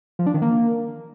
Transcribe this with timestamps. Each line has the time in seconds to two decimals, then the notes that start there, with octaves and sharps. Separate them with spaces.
0.19 F3
0.27 D4
0.34 D#3
0.42 A#3